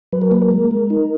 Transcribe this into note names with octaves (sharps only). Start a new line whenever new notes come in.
F#3 B4
A#4
A#3 B4
A#4
G#3
G#3
D#4